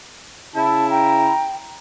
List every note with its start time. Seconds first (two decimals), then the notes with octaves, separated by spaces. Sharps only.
0.55 C#3 E4 A5
0.90 G5 A#5